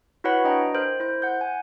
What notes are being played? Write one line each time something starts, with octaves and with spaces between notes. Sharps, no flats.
E4 F#4 B4 C#5 F#5 B5
D4 D#5 G5 A#5
A#4 C5
E4 C5
F#5 G6
G#5